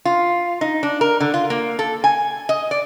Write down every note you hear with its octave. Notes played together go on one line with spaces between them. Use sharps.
F4
D#4
D4
A#4
D3
F4
A#3
A4
G#5
D#5
D5